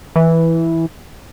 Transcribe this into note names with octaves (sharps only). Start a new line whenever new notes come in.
E3